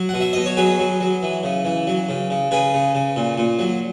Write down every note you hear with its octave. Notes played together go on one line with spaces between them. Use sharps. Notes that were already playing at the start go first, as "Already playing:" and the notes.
Already playing: F#3
B2 F#5
E5
B2 D#5
C#5
F#3 G#4 B4
F#3
F#3
E3
C#3
E3
F#3
C#3
C#3
C#3 G#4 B4
C#3
C#3
A#2
A#2
F#3